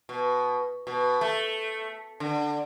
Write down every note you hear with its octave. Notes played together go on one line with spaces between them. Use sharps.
B2
B2
A3
D3